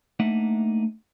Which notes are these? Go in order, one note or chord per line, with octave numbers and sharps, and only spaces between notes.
A3 A#3 D4 D#4 E5 F#5